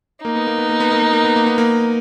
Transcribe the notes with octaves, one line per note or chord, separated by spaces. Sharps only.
A#3 D#4
B3
A#3
B3
A#3
B3
A#3
B3
A#3
B3
A#3
B3
A#3